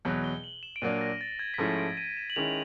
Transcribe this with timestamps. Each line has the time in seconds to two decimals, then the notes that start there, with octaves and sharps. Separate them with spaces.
0.05 E2 B2 F#3
0.24 G7
0.44 F#7
0.63 E7
0.76 D7
0.82 A#2 F#3 A#3 D4 D#7
1.01 A#6
1.21 A6
1.39 G#6
1.54 B6
1.58 G#2 F3 A3 C#4 E4 A#6
1.78 D7
1.97 D#7
2.17 E7
2.30 F#7
2.36 D#3 G#3 C#4 E4 F7